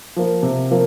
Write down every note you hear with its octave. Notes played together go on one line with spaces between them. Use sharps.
F3 A#3
C3
F3 A#3